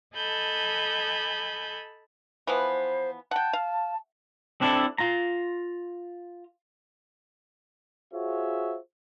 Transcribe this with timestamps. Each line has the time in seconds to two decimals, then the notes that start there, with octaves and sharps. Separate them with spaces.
0.14 A4 D#5 G#5 A5 B5 G6
2.47 E3 F3 B3 C5
3.31 F#5 G5 A5
3.53 F5
4.61 C4 D4 E4 A4
4.98 F4 A#5
8.13 F4 F#4 G#4 C5 C#5 E5